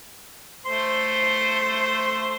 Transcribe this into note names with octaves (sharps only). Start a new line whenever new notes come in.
A3 C5 C6